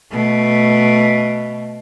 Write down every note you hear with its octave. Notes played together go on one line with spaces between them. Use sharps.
B2 A3